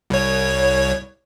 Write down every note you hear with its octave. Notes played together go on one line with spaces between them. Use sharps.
C2 C#5